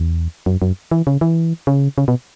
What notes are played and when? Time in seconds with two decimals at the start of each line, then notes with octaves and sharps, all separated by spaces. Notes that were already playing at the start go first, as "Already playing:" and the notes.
Already playing: E2
0.46 F#2
0.62 F#2
0.91 E3
1.07 C#3
1.21 E3
1.67 C#3
1.98 C#3
2.08 B2